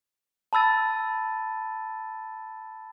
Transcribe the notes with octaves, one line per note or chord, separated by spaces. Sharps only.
A5 B5 E6 A6 D#7